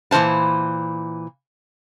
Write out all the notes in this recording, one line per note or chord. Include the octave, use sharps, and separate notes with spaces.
A#2 E3 A#4 C5 A5